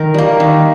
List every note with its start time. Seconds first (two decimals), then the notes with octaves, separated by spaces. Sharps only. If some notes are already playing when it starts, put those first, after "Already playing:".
Already playing: D#3 A#4
0.14 G3 A#3
0.40 D#3